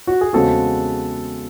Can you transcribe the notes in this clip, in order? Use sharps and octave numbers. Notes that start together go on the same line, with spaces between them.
F#4
G#4
E2 C#3 G#3 C4 F#4 A4